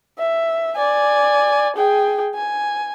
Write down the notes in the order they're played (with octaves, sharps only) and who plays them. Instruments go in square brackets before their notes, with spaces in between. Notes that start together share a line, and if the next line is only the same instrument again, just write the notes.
[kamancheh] E5
D5 G#5
G#4 G5
G#5